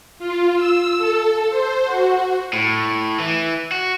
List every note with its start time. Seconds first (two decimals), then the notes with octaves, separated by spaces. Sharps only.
0.19 F4
0.56 E6
0.98 A4
1.50 C5
1.85 F#4
2.53 A2
3.19 E3
3.72 F#4